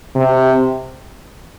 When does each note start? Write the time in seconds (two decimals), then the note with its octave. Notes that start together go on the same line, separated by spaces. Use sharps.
0.15 C3